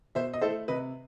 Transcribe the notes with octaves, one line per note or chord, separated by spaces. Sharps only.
B2 C5 E5
D#5
A3 E4 A4 C5
C3 B4 D#5